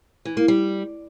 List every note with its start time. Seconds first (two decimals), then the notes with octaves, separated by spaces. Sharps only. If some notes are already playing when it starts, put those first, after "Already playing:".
0.25 E3
0.37 A#3
0.48 G3